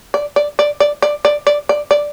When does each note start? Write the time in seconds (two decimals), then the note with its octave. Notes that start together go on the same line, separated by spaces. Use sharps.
0.14 D5
0.36 D5
0.59 D5
0.80 D5
1.02 D5
1.25 D5
1.47 D5
1.69 D5
1.91 D5